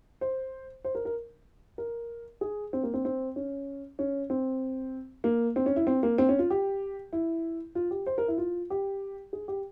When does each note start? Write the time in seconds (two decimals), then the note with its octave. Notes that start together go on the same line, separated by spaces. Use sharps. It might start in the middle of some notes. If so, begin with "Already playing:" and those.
0.21 C5
0.84 C5
0.95 A#4
1.05 A#4
1.78 A#4
2.41 G#4
2.73 C4
2.83 A#3
2.94 C4
3.05 C4
3.36 C#4
3.99 C#4
4.30 C4
5.24 A#3
5.56 C4
5.66 C#4
5.76 E4
5.87 C4
6.03 A#3
6.18 C4
6.29 C#4
6.39 F4
6.50 G4
7.13 E4
7.75 F4
7.91 G4
8.06 C5
8.18 A#4
8.28 E4
8.38 F4
8.70 G4
9.33 G#4
9.48 G4